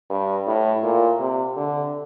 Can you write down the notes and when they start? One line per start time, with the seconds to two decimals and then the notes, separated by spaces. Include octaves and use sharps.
0.10 G2
0.47 A2
0.83 A#2
1.20 C3
1.56 D3